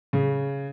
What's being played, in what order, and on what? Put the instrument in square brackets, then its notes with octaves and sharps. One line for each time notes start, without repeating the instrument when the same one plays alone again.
[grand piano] C#3